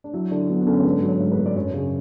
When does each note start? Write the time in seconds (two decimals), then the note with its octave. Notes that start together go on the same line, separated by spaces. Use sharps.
0.04 D4
0.13 F#3 E4
0.31 D3 D4
0.49 F#3 B3
0.62 B3
0.67 D3 C#4
0.78 C#5
0.84 G#2 B4
1.02 F#3
1.08 C#5
1.20 G#2
1.32 B4
1.38 G#2
1.46 D5
1.56 F#2 C#5
1.73 C#3